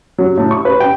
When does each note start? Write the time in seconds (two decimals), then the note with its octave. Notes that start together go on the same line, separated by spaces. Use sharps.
0.18 F#3
0.37 A2
0.51 C#6
0.65 B4
0.80 G5